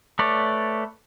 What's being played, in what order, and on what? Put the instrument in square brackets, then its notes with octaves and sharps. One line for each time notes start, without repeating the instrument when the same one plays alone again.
[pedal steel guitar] A3 B4 C#5 D5